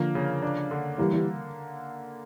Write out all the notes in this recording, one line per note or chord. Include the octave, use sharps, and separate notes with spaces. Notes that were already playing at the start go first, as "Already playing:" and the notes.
Already playing: D3 F3 A#3
C#3
D4
D3
E3 G3 A#3
E3 G3